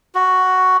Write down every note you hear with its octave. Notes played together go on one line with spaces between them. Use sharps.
F#4